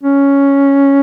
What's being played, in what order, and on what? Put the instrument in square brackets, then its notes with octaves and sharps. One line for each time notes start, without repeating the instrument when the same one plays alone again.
[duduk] C#4